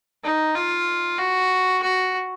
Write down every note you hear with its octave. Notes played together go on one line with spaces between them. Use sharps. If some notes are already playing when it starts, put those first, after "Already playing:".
D#4
F4
F#4
F#4